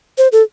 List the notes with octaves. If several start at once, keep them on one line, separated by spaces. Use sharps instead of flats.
C5
A4